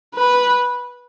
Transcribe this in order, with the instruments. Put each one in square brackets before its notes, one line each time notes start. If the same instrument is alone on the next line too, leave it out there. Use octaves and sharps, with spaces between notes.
[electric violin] B4